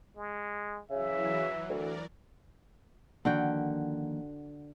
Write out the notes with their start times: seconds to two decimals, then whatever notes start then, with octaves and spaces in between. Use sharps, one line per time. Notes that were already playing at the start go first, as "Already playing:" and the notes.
0.17 G#3
0.91 C#3 E3 F#3 E5
1.69 D2 A#4 D5
3.25 D3 D#3 F3 A#3 F#4 G5